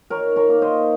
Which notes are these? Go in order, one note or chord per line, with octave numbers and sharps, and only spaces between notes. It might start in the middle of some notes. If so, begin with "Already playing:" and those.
D#3 A#4 C#5
A#4 C#5
A#3 D#4
C5 D#5